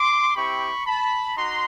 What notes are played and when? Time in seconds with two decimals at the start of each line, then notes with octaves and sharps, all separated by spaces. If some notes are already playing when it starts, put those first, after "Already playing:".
Already playing: C6 D6
0.35 C4 E4 G4 B5 C#6
0.86 A5 B5
1.36 D#4 F#4 A#5 C6